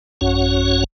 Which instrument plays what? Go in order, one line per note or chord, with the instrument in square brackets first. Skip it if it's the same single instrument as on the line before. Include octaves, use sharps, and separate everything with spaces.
[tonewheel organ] A1 F#2 C#4 F#4 C#5 F#5